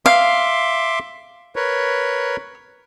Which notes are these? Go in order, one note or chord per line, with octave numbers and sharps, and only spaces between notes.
E5 F5 C6 D6
A#4 B4 C#5